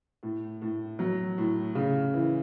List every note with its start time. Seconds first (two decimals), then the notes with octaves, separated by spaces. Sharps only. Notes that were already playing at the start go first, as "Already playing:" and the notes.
0.23 A2
0.62 A2
0.99 F#3
1.38 A2
1.75 C#3
2.14 E3